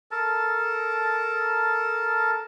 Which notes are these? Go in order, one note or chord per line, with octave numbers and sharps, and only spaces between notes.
A4 A#4 A5